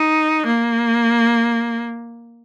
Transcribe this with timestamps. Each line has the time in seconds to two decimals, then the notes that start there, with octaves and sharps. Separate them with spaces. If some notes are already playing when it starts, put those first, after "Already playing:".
Already playing: D#4
0.46 A#3